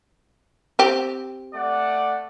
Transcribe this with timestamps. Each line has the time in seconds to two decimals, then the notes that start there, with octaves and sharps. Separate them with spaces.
0.79 C4 G4
1.55 A3 D5 F#5